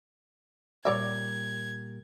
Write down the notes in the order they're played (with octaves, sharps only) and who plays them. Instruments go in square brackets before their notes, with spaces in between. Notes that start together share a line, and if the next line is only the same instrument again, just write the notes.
[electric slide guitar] A#2 G3 A#4 [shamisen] C#5 D5 E5 [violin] G#6